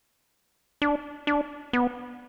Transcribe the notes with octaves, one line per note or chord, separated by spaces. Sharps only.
D4
D4
B3